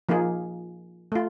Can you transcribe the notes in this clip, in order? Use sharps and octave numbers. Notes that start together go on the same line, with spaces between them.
F3 A#3 D#4 F4 G#4
A3 F4